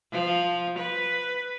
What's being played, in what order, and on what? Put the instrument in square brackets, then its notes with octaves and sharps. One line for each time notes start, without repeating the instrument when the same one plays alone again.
[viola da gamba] F3
B4